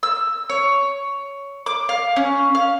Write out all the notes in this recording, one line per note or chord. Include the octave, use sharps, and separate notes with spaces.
E6
C#5
D6
F5
C#4
F5